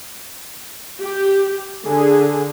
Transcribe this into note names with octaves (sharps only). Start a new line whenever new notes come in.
G4
D3 G#4